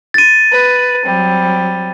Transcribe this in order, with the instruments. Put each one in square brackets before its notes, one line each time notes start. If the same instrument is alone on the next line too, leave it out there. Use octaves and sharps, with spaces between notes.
[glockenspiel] A6 D#7
[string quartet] B4
F#3 G3 C4